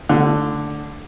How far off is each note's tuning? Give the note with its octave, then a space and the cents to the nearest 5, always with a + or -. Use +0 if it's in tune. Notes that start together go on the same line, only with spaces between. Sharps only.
D3 +0 A3 +0